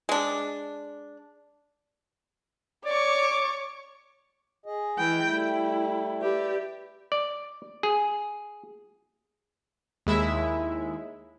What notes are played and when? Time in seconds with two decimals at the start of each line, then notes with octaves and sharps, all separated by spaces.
0.09 G#3 D4
2.85 C#5 D5 C#6 D6
4.66 G#4 D#5
4.98 E3 G5
5.27 G3 A3 E4
6.22 G4 B4 D5 E5
7.12 D5
7.83 G#4
10.07 D#2 G#3 E4 E5